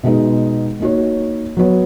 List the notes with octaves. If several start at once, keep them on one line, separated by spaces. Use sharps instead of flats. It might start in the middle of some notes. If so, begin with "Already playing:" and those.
B2 G#3 B3 D#4
A#3 D#4 F#4 C#5
F#3 B3 F#4 C#5